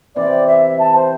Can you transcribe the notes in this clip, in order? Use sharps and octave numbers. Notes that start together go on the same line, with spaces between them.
C3 E3 C4 D5
E5
A5
C5